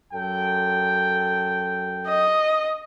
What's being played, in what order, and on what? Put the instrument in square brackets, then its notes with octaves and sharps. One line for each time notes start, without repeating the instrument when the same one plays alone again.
[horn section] F#2 A4 G5
[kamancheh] D#5